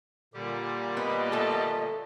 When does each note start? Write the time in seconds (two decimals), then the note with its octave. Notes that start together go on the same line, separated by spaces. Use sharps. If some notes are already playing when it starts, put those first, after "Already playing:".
0.34 A#2 D3 G3 G4
0.97 B3 D#5
1.32 A3 A4